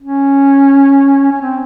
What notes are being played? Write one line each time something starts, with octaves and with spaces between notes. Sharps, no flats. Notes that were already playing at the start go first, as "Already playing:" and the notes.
C#4
C#4
C4